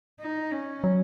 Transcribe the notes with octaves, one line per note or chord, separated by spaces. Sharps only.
D#4
C#4
F#3